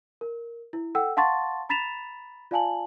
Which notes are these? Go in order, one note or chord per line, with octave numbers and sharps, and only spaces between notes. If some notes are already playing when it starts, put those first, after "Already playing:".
A#4
E4
A4 F#5 G5 E6
F5 F#5 A5 C6 C#6 A6
A#5 B5 A6 B6 E7 F7
F4 D5 F5 G#5 A5 F#7